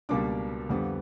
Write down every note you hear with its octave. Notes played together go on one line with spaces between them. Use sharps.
C#2 B2 G3 A#3 D4 D6
F2 D3 G3 B3